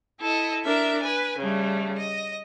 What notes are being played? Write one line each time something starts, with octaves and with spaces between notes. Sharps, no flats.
E4 A4 D#5
D4 A#4 E5
B4 G#5
C#3 G3 A3
D#5